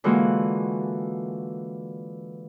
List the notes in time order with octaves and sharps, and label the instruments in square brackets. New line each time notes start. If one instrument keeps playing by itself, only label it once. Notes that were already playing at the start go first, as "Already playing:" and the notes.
[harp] D3 E3 G#3 A#3 F4 F#4